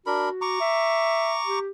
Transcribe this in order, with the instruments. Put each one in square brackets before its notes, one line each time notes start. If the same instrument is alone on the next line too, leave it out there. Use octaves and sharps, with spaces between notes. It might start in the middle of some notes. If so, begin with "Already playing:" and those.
[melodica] D4 A#4 B5 [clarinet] F#4
[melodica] A#5 C#6 D6
[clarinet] E5
G4